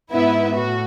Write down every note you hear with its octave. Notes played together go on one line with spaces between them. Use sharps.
G#2 B3 E4 B4 E5
A2 F#4